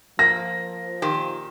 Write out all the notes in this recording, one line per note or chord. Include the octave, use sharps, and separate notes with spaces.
F3 A#3 A#6
A#2 D#3 G4